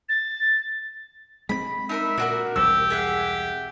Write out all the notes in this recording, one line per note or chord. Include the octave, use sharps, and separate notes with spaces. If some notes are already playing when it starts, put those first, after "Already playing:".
A6
G#3 A#3 C4 B5
D#4 A#4 E5 B5
A#2 D4 F#4 A#4
E1 C2 C3 G4 E6
G#4 E5 F#5